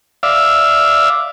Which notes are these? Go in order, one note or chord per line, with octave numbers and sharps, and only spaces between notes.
D5 E5 F5